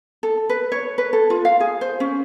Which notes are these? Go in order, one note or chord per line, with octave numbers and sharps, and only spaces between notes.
A4
B4
C#5
B4
A4
F4
F5
G#4
C5
C#4